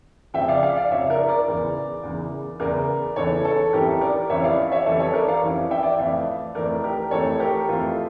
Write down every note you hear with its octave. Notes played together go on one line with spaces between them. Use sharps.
F2 C#3 F3 E5 G5
D5 F5
D5 F5
D5 F5
F2 C#3 F3 C#5 E5
A#4 D5
A#4 D5
E2 C#3 E3
E2 C#3 E3
E2 C#3 E3 A#4 D5
E2 C#3 E3 A4 C#5
A4 C#5
F2 E3 G3 C#4 E4 G4 A#4
A#4 D5
F2 E3 G3 C#4 E4 C#5 E5
D5 F5
C#5 E5
F2 E3 G3 C#4 E4 A4 C#5
A4 C#5
A#4 D5
D5 F5
F2 E3 G3 C#4 E4
E5 G5
D5
E5
F2 E3 A3 D5 F5
F2 E3 A3 A#4 D5
G4 A#4
F2 E3 A3 A4 C#5
G4 A#4
F2 E3 A3 F4 A4